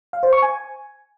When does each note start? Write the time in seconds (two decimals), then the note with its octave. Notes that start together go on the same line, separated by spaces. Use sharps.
0.13 F5
0.23 C5
0.33 C#6
0.42 G#5